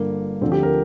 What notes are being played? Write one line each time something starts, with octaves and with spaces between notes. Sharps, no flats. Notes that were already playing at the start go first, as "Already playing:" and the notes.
Already playing: G1 G2 D3 A#3
D2 D3 F3 C4
G4
A#4